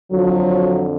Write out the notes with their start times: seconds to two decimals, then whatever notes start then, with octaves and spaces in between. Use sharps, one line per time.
0.12 F2 D3 F3 F#3